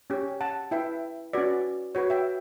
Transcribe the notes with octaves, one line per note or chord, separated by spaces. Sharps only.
C#4 G4 C#5
F#5 A5
E4 B4 E5 G5
C#4 F#4 B4 D5
F#4 B4 C#5
E5 G5